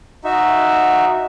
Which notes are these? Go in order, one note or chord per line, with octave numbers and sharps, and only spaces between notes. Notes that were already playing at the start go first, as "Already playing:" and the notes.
D#4 F#4 E5